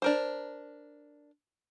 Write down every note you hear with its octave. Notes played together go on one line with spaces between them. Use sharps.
D4 A#4 C5